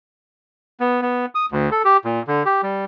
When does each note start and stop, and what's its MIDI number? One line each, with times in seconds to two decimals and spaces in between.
0.80 1.01 59
1.02 1.26 59
1.35 1.46 87
1.52 1.70 38
1.71 1.82 69
1.85 1.97 67
2.05 2.22 46
2.28 2.43 50
2.46 2.61 67
2.63 2.85 55